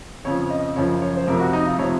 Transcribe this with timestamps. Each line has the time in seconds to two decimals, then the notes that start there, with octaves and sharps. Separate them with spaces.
0.25 F2 C#3 F3 C#5
0.50 D#5
0.76 F#2 C#3 F3 C#5
1.02 C#5
1.17 C5
1.27 F2 C3 F3 A#4
1.40 F#4
1.53 D#4
1.66 F4
1.79 C3 F3 C#5